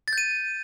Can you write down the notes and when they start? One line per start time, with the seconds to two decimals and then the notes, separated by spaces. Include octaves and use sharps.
0.08 A6
0.13 G6
0.18 D#7